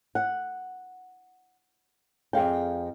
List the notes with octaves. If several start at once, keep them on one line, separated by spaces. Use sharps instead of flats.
F#5
F2 G#4 F5 G5